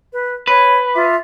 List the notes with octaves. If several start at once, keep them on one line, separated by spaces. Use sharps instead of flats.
B4
B4 C#5 B5
F4 E5 D6